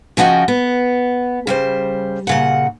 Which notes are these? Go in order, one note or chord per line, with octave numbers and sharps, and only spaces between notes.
C#3 F3 C#4 F#4 D#5 G5
B3
C#3 G3 C5
A#2 C#3 F#5